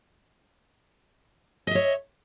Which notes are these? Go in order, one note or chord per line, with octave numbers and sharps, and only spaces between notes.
C#5 D#5 E5